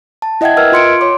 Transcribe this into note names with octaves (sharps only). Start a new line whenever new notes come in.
A5
E4 D#5 E5 F#5 G5 G#6
A#4 B4 D#5 E6 F6 G#6
F4 C6 C#7 D7
C#5 C6 D6